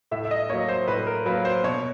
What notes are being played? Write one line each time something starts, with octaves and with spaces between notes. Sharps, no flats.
A2 E5
E5
D#5
F#3 A#3 C#5
C5
A2 B4
A#4
F#3 A#3 B4
C5
B2 C#5